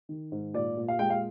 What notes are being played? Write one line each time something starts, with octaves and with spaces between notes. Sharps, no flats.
D#3
G#2
A#2 D5
A#2
F5
G#3 G5
F5